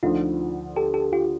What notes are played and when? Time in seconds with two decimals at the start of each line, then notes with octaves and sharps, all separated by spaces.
0.03 D2 D3 F3 D#4 F4
0.76 G4 A4
0.94 G4 A4
1.13 F4 G4